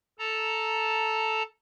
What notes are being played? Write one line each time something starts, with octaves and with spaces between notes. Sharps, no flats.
A4 A5 A#5